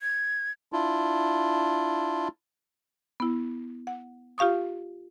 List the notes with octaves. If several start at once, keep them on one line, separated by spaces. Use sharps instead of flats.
G#6
D4 E4 F4
B3 E4
F#5
F4 G4 F5 C#6 D#6